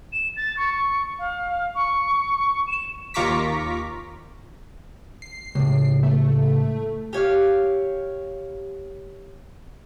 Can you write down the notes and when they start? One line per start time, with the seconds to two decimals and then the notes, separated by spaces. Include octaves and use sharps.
0.12 E7
0.36 A6
0.57 C#6
1.19 F5
1.75 C#6
2.67 E7
3.14 D#2 F4 A#5 C#6 D6 B6
5.22 C7
5.55 C#2 A2
6.03 A3
7.13 G4 C#5 E5 F5